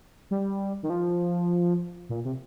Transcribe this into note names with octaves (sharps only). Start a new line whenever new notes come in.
G3
D#3
F3
A#2
C3